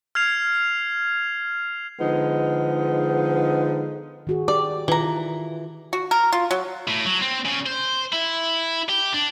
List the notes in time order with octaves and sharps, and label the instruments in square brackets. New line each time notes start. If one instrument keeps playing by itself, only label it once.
[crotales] F6 G#6 C7 F7
[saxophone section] D3 F3 G#3 B3 D#4
[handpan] D#3 F#4 G#4
[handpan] G4 [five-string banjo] D5
[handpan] D#3 F4 [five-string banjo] E3 A#5
[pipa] F#4
A#4
F4
F#3
[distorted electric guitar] A2
F#3
C4
C#3
C5
E4
G4
D4